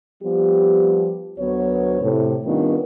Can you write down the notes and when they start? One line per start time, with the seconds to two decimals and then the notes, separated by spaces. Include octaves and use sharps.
0.23 F3 G3 B3 G4
1.38 D2 F#3 B3 C#5
2.01 A2 C3
2.45 D#3 G3 B3 C#4 D4 F4